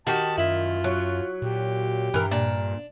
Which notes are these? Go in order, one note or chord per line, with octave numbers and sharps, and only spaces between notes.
D#3 F#4 G4 A5
F#2 E4 F4
F#3
A#2 G4
G2 E3 A#4
A#2 D4